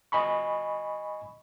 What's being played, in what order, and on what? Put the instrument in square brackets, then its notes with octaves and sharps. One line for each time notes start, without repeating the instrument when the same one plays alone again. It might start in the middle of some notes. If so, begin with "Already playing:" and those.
[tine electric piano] D#5 G#5 B5 C#6